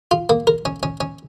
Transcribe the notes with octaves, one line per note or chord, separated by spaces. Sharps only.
F4
A#3
A#4
C#4
C#4
C#4